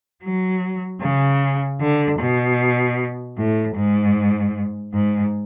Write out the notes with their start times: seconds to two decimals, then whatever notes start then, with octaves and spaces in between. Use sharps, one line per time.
0.24 F#3
1.02 C#3
1.81 D3
2.20 B2
3.37 A2
3.76 G#2
4.94 G#2